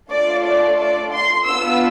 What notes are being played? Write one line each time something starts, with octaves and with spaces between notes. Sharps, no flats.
A3 D4 F4 A4 D5
D5
D5
C6
B3 D4 F4 E6